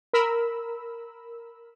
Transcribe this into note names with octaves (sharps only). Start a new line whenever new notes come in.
A#4 B5 E6